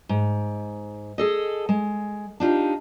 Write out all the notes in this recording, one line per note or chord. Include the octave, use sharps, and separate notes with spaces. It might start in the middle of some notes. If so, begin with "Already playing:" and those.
G#2
G#4 A4 D#5
G#3
D4 D#4 F4 G4